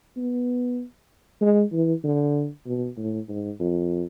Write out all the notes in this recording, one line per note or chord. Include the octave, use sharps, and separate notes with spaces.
B3
G#3
E3
D3
B2
A2
G#2
F2